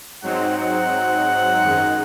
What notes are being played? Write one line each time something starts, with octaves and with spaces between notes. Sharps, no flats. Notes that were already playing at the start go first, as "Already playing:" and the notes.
G#2 F#3 C4 D#4 F#5
F#5
F#2 D#3 G#3 D#4